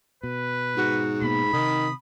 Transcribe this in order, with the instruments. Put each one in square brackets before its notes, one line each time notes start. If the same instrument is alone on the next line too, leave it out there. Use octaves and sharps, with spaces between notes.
[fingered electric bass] B2 [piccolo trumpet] B4
[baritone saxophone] G#2 [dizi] F#4
[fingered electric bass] B2 A#3 B3 [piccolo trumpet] B5
[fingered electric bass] C3 [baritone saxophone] D#3 [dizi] D#6